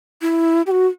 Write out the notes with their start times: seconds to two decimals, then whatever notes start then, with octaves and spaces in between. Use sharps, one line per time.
0.22 E4
0.67 G4
0.71 F#4